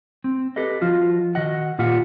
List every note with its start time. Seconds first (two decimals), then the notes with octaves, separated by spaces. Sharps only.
0.24 C4
0.56 G4 A4 B4 D#5
0.81 F3 F4 F#4
1.35 D#3 F#4 D#5 F#5
1.79 A#2 F4 G4 F#5